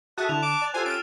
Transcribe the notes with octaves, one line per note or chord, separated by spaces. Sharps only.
F#4 G#4 A4 E5 A5 D#6 F#6
D3 E4 A5 F7
D6 E7
D5
F4 G4 A4 C5 G#5
C#4 F6 F#6 A6 D7 D#7